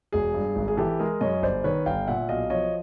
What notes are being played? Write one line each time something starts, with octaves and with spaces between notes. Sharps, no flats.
E1 G#4
G2
G#1
G#4
E3 G4 A4
G#3 G#4 A#4
F#2 C#5 D#5
G1 C5 D5
D#3 B4 C#5
G1 F5 G5
A#2 E5 F#5
B1 D#5 F5
F3 C#5 D#5